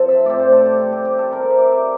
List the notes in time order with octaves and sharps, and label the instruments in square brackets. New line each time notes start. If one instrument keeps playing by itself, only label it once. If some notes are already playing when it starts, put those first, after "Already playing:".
Already playing: [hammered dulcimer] F3 C4 A4
E5
A2 F3 C4 D5
C5
A4
G4
C3 G3 C4
G4
G4
A4
C3 G3 C4 A#4
E5
D5
E5